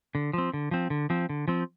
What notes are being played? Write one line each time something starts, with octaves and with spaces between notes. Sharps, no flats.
D3
F3 C4
D3
F3 C4
D3
F3 C4
D3
F3 C4